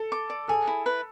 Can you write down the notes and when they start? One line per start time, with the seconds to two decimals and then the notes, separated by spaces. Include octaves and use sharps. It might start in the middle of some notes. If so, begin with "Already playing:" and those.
Already playing: A4
0.12 D6
0.30 D5
0.48 G#4 A4
0.67 E4
0.86 B4